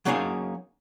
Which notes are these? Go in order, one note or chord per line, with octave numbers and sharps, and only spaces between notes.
F#3 A#3 C#4 D#4 G#4 F5